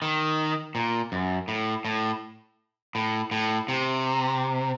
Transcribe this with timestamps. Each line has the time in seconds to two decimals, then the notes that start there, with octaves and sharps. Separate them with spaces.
0.02 D#3
0.75 A#2
1.12 F#2
1.48 A2
1.85 A2
2.95 A2
3.31 A2
3.68 C3